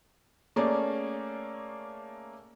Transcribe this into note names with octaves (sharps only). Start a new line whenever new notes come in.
A3 A#3 C#4 G#4 D5